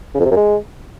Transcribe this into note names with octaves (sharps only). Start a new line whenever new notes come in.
C#3
F2
C3
F#2
G#3